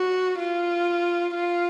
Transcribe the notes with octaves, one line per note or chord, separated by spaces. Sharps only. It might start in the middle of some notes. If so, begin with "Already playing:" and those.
Already playing: F#4
F4
F4